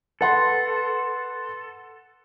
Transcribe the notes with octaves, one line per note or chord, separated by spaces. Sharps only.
A4 B4 F#5 C6